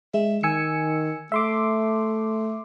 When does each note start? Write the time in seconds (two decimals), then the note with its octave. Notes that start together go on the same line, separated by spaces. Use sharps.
0.14 G#3 E5
0.43 D#3 G#5 E6 C#7
1.32 A3 E5 C6 D6